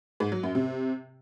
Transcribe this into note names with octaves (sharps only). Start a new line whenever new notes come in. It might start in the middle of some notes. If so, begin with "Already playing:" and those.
G#2
F#3
F#2
C3